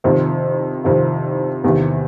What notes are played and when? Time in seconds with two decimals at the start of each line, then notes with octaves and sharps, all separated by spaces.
0.04 F2 C3 D#3
0.84 F2 C3 D#3
1.64 E2 C3 D#3